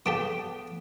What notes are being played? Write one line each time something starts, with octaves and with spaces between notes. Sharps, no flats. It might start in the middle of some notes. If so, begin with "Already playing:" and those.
B3 G4 A4 C#5 F5 A5 D6